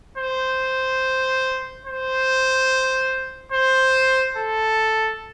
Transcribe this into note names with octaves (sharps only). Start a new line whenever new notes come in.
C5
C5
C5
A4